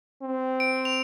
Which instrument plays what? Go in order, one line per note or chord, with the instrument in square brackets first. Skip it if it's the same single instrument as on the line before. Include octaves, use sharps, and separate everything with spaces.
[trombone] C4
[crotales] D7
F7